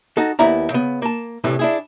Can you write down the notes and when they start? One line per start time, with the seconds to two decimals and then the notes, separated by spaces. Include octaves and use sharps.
0.17 D#4 F#4 A4
0.39 D#2 B3 E4 D5 A#5
0.70 C#3 B3
1.02 A#3 A5
1.44 C2 A2 C3 E3
1.59 D4 E4 G#4